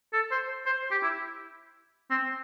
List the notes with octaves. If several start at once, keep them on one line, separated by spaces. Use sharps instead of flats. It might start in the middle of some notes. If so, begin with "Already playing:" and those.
A4
C5
C5
G4
E4
C4